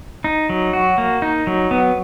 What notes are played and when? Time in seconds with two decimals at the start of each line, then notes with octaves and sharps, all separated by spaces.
0.24 D#4
0.50 F#3
0.73 F#4
0.98 A#3
1.22 D#4
1.47 F#3
1.71 B3